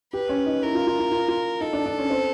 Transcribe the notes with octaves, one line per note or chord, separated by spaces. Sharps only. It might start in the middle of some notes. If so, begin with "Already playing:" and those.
G4 B4
C#4
D#4
E4 A#4
F4
F4
F4
F4
F4
D#4 A4
D4
D4
C#4
C4